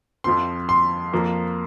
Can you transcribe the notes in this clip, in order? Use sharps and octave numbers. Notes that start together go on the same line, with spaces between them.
F2 F3 C4 C6
C6
F2 F3 A#3